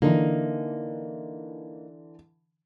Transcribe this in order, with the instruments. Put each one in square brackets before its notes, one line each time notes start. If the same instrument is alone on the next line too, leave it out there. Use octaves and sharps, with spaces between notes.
[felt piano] D3 E3 [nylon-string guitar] A#3 D#4